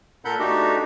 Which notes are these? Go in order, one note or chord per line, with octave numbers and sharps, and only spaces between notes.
A#2 A4 A#4 F#5 B5 G6
A3 B3 D4 D#4 F#4 G4